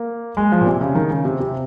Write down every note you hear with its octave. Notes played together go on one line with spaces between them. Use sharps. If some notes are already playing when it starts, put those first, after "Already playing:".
Already playing: A#3
G#3
F3
A#2
C3
C#3
D#3
C#3
C3
C3